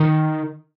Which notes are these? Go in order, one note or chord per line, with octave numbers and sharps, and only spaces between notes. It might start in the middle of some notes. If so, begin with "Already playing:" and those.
Already playing: D#3